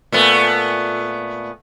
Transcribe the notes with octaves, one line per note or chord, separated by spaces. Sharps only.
A#2 A3 B3